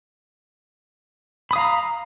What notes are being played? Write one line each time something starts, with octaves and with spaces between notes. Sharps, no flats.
F5 A#5 B5 D#6